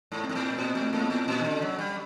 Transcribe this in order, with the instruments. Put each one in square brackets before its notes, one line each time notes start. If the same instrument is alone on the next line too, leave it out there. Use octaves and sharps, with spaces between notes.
[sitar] G#2
[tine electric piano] C4
[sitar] G#2
A2
[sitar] A#2 [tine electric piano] C4
[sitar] A2
[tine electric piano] A3
[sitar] G#2 [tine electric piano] A#3
[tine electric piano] B3
[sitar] A2
[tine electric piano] C4
[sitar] A#2 [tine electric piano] C#4
[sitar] D#3
D3
F#3
G3